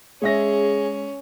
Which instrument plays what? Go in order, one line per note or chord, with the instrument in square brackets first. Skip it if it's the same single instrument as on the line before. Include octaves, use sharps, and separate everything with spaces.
[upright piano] G#3 E5 A#6 [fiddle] C#4 [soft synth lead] G#4